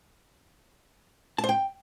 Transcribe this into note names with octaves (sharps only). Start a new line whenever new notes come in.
A5
C5
G5